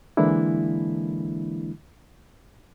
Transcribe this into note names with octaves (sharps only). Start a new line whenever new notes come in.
D3 E3 G#3 A#3 D4 E4